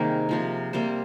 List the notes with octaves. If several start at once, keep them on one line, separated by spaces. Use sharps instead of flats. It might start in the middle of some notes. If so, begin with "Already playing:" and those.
Already playing: C3 D#3 G3 A#3 G#4 A#4
C3 F3 A#3
C3 G3 A#3 C5